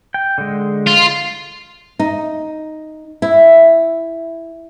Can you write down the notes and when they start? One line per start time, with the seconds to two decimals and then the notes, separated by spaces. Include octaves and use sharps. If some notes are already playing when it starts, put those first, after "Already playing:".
0.14 G5
0.38 D3 G#3
0.87 F4
1.99 D#4
3.22 E4